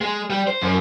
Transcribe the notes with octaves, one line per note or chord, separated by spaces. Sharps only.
G#3
G3
C5
F#2